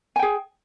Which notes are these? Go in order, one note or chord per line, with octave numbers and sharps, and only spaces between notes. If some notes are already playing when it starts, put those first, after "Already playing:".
G#4 G5 G#5